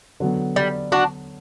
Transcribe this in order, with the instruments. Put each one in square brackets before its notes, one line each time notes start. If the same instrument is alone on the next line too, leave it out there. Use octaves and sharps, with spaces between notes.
[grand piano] D3 F#3 B3
[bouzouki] G3
D4 F#4